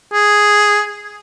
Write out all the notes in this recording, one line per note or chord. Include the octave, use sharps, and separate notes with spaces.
G#4